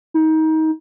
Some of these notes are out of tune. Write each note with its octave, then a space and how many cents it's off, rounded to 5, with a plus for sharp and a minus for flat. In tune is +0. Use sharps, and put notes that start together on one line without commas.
D#4 +25